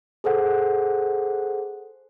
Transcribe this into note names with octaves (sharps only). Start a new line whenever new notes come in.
G#4 A4 C5 F#5